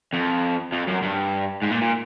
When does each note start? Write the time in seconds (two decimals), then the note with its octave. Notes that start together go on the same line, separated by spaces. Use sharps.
0.13 F2
0.73 F2
0.88 F#2
1.03 G2
1.63 G#2
1.72 A#2
1.82 A#2